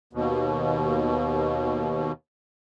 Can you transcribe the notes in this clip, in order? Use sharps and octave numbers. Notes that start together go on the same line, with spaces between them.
D#2 B2